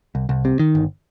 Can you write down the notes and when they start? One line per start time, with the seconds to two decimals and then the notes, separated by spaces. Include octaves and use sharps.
0.15 C2
0.29 C2
0.45 C3
0.59 D#3
0.75 G1